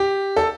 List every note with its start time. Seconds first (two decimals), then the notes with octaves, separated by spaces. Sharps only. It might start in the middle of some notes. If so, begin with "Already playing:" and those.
Already playing: G4
0.36 A4